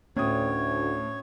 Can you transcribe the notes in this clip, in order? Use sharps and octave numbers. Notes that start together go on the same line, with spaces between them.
D2 A2 C#4 C#5 D#6